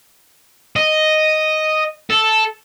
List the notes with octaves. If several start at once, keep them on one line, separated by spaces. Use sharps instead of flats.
D#5
A4